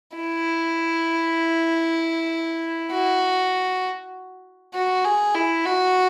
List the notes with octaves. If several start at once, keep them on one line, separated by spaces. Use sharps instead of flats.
E4
F#4
F#4
G#4
E4
F#4